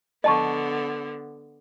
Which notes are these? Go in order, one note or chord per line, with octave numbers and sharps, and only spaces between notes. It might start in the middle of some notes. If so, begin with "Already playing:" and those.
D3 B3 D#5 A5 C#6